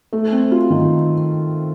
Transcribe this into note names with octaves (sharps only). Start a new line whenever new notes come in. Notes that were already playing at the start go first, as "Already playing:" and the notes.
A3
C4
F4
D#3